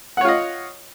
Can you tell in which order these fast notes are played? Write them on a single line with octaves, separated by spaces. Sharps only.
F#5 C#5 F4 D#5